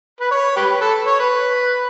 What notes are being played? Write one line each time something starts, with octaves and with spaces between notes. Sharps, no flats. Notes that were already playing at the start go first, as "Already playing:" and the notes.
B4
C#5
G4 B4
A4
C#5
B4